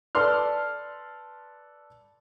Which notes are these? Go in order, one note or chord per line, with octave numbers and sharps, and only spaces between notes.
A4 B4 D5 C6 F6